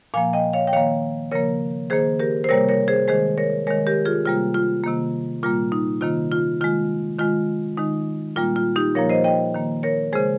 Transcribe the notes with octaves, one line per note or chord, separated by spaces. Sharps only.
A#2 F3 A#3 F5 G#5
D#5 G5
C#5 F5
G5
D#3 A#3 C#5 F5
C#3 F3 A#3 A#4 C#5
D#3 A#3 G#4 C5
G4 A#4
C5
C3 G3 A#3 A#4 C#5
A#4 C#5
G#4 C5
D#3 G#3 G#4 C5
A#4 C#5
D#3 G#3 A#4 C#5
G4 A#4
F4 G#4
C3 G3 A#3 F4
F4
C3 D#3 A#3
A#2 G3 A#3 F4
D#4
C3 D#3 A#3 F4
F4
D#3 G#3 F4
D#3 G#3 F4
D#3 G#3 D#4
A#2 G3 A#3 F4
F4
D#4 G4
A#2 F3 A#3 A#4 C#5
C5 D#5
D#5 G5
D#3 A#3
A#4 C#5
C#3 G#3 G#4 C5